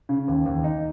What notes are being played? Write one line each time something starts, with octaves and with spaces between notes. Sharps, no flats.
C#3
D#2
D#2
D#4